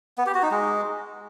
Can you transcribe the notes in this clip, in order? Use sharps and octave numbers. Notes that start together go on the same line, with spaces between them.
B3
G4
F#4
D#4
G#3